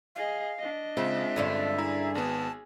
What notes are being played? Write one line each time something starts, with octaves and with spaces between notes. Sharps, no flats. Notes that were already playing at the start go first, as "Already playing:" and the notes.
G#4 D#5 F5
D4 D#5
C#3 G#3 C4 F4 E5
G2 D3 C#4
E4 G#4 A#5 E6
G#1 B3 A5